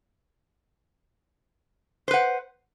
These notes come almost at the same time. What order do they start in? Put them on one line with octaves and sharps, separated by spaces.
C5 B4 F#5